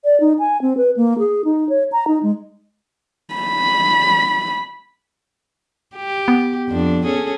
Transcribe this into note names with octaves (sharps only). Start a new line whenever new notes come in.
D5
D#4
G#5
C4
B4
A#3
G#4
D#4
C#5
A#5
D#4
G#3
B5
G4
B3
F2 D4
C#4 G#4 A4